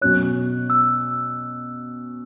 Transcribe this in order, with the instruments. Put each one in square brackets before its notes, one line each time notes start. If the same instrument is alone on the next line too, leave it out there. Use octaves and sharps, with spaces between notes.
[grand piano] B2 F#3 C#4 F#4 C#5 [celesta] F#6
[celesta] E6